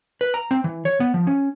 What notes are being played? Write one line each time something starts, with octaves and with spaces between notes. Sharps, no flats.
B4
A#5
C4
E3
C#5
B3
F3
C#4